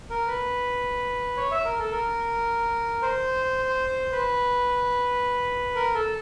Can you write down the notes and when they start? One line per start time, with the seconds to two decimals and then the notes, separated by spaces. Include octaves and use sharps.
0.10 A#4
0.27 B4
1.37 C#5
1.51 E5
1.65 A#4
1.79 A4
1.92 A#4
3.02 C5
4.12 B4
5.76 A#4
5.94 A4